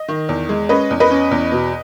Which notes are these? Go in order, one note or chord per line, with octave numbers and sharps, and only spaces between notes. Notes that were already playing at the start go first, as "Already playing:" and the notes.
Already playing: D#5
D#3
E2
G#3
C#4 B4 D#5
E2
B4 D#5
C#4
E2
B2